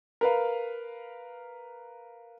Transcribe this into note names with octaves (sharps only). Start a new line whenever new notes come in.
A#4 B4 F5